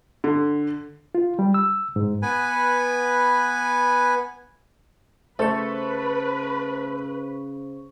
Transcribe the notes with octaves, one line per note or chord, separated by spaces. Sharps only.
D3
F4
G3
E6
G#2
B3 B4 G#5
C#3 A3 A4 B4 C5 C#6